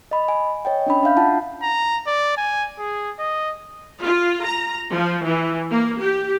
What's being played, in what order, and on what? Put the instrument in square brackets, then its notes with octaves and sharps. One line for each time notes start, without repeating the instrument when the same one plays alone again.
[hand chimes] D#5 B5
G#5
C#5 D#5 G5
C#4 D4 B5
D4 E5 F5 G6
E4 F4 F#5 A5
[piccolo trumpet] A#5
D5
G#5
G#4
D#5
[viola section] F4
A#5
F3
E3
A#3
G4